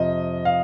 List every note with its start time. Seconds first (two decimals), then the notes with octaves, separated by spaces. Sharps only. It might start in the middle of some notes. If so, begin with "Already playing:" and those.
Already playing: F2 C3 F3 D#5
0.45 F5